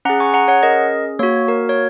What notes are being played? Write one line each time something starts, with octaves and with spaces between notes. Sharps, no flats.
C#4 G#4 F#5 A#5
G#5 C#6
F#5 A#5
C#5 F#5
A#4 D#5
A#3 F#4 C#5
A#4
C#5